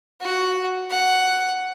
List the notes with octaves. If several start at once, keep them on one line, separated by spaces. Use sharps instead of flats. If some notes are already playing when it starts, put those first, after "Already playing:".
F#4 F#5
F#5